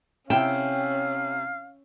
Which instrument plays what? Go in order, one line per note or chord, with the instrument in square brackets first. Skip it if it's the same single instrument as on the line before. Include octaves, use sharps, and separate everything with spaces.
[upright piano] C3 E4 E7 [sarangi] C#4 [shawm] F5 [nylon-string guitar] G5